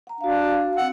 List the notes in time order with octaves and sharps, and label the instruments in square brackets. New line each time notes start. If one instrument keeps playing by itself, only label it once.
[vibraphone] F#5 A#5
[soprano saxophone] D4 [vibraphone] F#4 F5
[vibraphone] C4 E6 [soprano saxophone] F#5